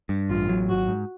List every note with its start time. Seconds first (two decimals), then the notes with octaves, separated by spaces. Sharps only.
0.09 G2
0.30 A1 F4
0.49 F#3
0.69 G#1 F#4
0.88 G#2